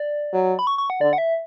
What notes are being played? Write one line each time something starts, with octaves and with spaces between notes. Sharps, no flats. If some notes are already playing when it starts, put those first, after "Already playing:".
Already playing: D5
F#3
B5
C#6
C#6
F#5
D3 D5
F#5
E5